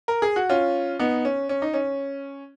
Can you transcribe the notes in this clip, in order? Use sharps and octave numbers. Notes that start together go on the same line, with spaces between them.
A#4
G#4
F#4
C#4 F4
B3 D#4
C#4
C#4
D#4
C#4